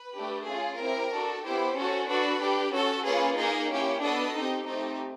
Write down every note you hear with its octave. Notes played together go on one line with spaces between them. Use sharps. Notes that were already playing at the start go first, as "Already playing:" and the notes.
Already playing: B4
A3 D4 G4
C#4 F4 G#4
C4 E4 G4 A#4
D4 F#4 A4
B3 E4 G4 C5
C#4 F#4 A4
D4 F#4 A4 B4
D4 G4
C#4 F#4 A4
A#3 C#4 F4 G#4 B4
A#3 D#4 G#4 A#4
A#3 C#4 E4 G4
B3 D4 F#4 A4 D#5
C4 D#4 G4
A3 C4 D#4 G4